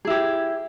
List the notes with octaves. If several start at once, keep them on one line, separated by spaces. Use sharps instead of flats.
E4 G4 G#4